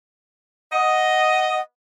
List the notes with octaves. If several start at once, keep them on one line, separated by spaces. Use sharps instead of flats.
D#5 F#5